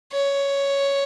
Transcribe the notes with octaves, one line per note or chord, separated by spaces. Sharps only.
C#5